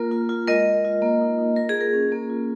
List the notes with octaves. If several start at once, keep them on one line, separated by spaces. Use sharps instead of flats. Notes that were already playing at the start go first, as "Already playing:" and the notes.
Already playing: A#3 F4 A#4
F4
F4
G#3 A#4 D#5
F4
F4
A#3
D#4
D#4
F4 A#4
G#4
A#3
A#4
C#4
A#3
F4